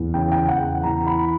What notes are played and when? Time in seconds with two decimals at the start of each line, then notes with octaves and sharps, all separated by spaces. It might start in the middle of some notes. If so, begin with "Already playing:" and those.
Already playing: E2
0.14 C#3 G5
0.32 G5
0.48 E2 F#5
0.83 E3 A#5
1.07 B5